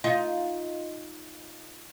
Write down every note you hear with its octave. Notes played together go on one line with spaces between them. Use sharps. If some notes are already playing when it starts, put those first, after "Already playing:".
D#4 F4